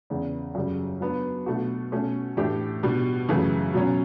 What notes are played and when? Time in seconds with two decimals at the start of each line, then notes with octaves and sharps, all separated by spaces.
0.10 E2 C#3 E3
0.55 F#2 C#3 G3
1.01 F#3 B3 D4
1.46 B2 A3 D4 F#4
1.92 B2 A3 C#4
2.37 A2 E3 A3 D4 G4
2.83 B2 G3 D4
3.29 F#2 C#3 E3 A3
3.74 B2 F#3 C#4